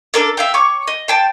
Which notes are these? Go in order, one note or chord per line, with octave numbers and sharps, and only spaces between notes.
D4 A4 A#4 D5
E5 F5 G5
C#5 C#6 D6
D#5
C5 G5 A5